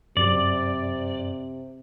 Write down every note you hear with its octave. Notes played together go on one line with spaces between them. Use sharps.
F#2 C3 D5